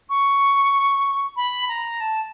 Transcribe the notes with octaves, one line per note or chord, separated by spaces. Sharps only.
C#6
B5
A#5
A5